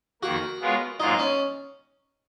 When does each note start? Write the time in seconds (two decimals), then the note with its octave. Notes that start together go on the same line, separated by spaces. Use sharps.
0.22 F2 D#3 A#3 F#4
0.61 G#3 B3 F4 A#4 C#5
1.00 G#2 F#3 A#3 D#4 F4
1.19 C#4